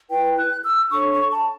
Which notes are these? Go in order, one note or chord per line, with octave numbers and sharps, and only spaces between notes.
E4 B4 G5
F#6
E6
D4 A4 C#5 C#6
C#6
A5